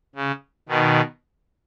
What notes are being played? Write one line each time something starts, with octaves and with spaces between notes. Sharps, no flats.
C#3
B2 D#3